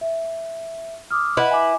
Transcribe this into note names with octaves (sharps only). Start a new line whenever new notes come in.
E5
D6 D#6 F6
E4 B4 D#5 F#5
G#5 D6